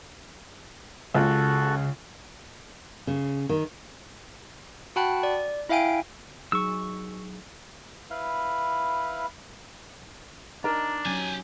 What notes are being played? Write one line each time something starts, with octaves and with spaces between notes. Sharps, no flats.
C#2 C#3 F#4 A4
C#3
D#3
F#4 F#5 G5 A5 B5 F#6
D5
E4 E5 F5 G5 G#5 D7
F#3 D#4 G#4 C#6 E6
E4 B4 F5
D4 D#4 A#4 A#5
F#3 C#4 G4 G#5